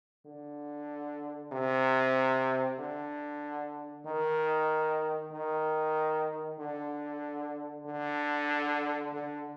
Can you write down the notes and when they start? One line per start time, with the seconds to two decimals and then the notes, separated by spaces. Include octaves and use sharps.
0.26 D3
1.52 C3
2.79 D3
4.06 D#3
5.32 D#3
6.59 D3
7.86 D3
9.13 D3